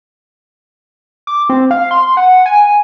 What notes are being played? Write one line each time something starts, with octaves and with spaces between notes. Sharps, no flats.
D6
C4
F5
C6
F#5
G#5